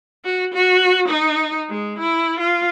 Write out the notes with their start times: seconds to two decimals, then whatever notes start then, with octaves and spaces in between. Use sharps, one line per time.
0.25 F#4
0.54 F#4
1.08 D#4
1.70 G#3
1.99 E4
2.39 F4